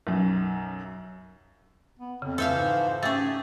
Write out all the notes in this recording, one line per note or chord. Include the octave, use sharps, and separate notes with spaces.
B1 F#2
B3
F2 C#3
E3 F3 A4 C5 E5 F5
G#2
A3 C#4 G4 G#4 A6